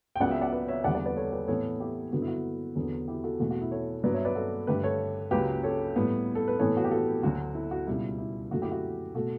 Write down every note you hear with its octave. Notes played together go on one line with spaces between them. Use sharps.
G5
C#2 C#3 F#3 B3 D5 F#5
E5 G5
D5 F#5
B4 D5
C#5 E5
E2 D3 G3 B3 D5 F#5
D5 F#5
B4 D5
A4 C#5
G4 B4
A2 E3 B3 A4 C#5
E4 G4
G2 D3 F#3 B3 F#4
E4
F#4
E2 D3 F#3 B3
E4 G4
F#4 A4
E2 B2 A3 F#4
F#4
E4
A4 C#5
G2 F#3 B3 B4 D5
C#5 E5
B4 D5
F#4 A4
G2 D3 A3 G4 B4
A4 C#5
C#2 C#3 F#3 G4 B4
A4 C#5
A2 G3 B3
A4
B4
A2 E3 B3 A4 C#5
F#4
G4
F#4 A4
D2 D3 F#3 F#4
E4
F#4
C#2 B2 G3 E4
E4
F#2 D3 F#3 A3 F#4
E4 G4
F#4
B2 A3 F#4 A4